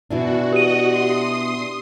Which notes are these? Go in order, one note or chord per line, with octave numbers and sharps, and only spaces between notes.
B2 E3 D4 F#4
F#4 G4 D#5 F#5 D#7
C6 D#6